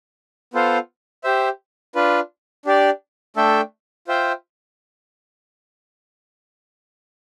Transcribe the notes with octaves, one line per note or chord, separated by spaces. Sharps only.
B3 F4 A4 C5 F5
G4 C5 E5
D4 F4 B4
D4 G4 D5
A3 D4 A4 E5 G5
F4 C5 E5 G5